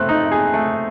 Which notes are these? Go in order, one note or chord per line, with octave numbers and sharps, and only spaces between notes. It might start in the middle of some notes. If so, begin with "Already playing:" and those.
Already playing: A3 C4 F#6
D#4
G#4
A3